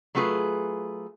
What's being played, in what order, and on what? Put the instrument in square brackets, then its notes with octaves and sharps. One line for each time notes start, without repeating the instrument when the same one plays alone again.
[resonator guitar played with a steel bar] F#3 A3 F4 G#4 B4